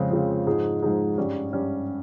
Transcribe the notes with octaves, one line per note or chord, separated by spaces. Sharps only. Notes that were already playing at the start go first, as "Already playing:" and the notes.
Already playing: F2 C#3 G#3 C4 F4
F2 C#3 G#3 C4 F4
G#2 F3 G#3 D#4 G#4
G#2 F3 G#3 D#4 G#4
G2 G3 C#4
G2 G3 C#4